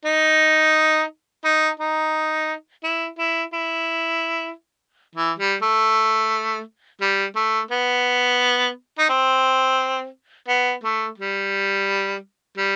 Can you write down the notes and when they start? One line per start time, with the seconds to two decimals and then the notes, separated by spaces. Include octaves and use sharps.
0.05 D#4
1.45 D#4
1.80 D#4
2.84 E4
3.18 E4
3.53 E4
5.15 E3
5.39 G3
5.62 A3
7.01 G3
7.36 A3
7.71 B3
8.98 D#4
9.09 C4
10.48 B3
10.83 A3
11.18 G3
12.57 G3